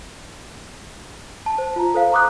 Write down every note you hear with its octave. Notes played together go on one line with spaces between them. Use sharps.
A5
C5
F4 A#5
A4 C5 F5
A#5 C6 D6 D#6 F#6